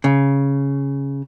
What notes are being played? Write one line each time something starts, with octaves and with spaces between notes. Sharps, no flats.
C#3